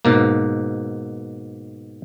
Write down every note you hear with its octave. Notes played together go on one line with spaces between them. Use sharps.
G#2 B2 A#3